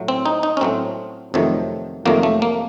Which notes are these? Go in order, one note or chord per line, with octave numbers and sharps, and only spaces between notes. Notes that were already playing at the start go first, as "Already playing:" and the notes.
Already playing: A2 F#3 A3
C4
D#4
D#4
C#4
A2 F#3 A3 C4
F2 C3 D#3 F#3 A3
F2 C3 D#3 F#3 A3 A#3
A3
A#3